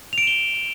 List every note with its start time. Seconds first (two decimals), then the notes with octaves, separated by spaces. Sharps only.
0.13 F7
0.18 D7
0.23 E7
0.27 G7